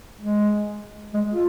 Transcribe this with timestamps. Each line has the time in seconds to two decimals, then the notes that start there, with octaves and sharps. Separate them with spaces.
0.20 G#3
1.14 G#3
1.33 F4